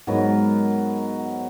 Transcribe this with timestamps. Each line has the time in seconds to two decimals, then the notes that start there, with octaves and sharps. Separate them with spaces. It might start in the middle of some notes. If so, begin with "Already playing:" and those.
0.07 G#2 F#3 B3 A#4